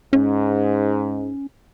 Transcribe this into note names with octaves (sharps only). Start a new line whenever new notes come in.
G#2 C#4